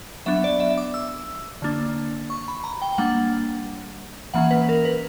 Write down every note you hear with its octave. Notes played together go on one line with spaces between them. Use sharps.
F#3 B3 D4 E5
D5
E5
D6
E6
D3 A#3 D4
C#6
B5
A#5
G5
G5
G3 A#3 D4 F#5
E3 A#3 C#4 F#5
B4
A#4
B4